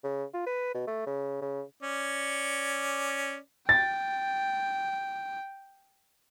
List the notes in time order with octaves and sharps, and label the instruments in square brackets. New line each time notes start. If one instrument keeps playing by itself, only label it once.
[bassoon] C#3
F4
B4
B2
A3
C#3
C#3
[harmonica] C#4 D5
[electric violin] G5 [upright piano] A6